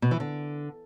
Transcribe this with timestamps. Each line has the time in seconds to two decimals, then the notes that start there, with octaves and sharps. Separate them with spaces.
0.02 B2
0.11 E3
0.20 D3